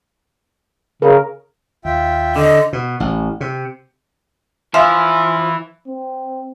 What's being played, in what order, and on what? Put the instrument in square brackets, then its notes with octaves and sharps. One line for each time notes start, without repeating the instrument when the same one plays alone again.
[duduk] C#3 [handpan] A#4
[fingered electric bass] D#2 [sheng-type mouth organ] F4 E5 G5
[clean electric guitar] D3 [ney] D#5
[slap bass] B2
A1
C3
[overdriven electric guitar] E3 E4 [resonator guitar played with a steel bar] F3 [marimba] E5 F5 [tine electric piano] G#5 C6 F6
[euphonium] C4